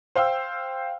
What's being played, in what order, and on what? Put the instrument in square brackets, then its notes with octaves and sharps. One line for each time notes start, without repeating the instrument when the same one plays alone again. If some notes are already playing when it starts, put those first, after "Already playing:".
[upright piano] C5 F5 G5 E6